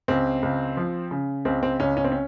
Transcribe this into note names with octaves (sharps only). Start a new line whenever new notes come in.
C#2 C4
C#2
F3
C#3
C#2 C4
C4
C#2 C#4
C#4
C4
C#4